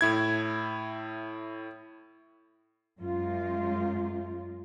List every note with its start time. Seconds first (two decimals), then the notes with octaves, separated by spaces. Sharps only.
0.01 A2 E4 G#6
3.01 F#2 G#3 F4